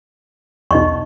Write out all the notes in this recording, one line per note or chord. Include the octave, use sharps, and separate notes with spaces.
B1 E2 D#4 D#5 C#6